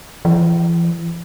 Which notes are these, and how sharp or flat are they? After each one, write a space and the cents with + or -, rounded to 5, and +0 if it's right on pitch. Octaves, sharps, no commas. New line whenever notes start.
E3 +45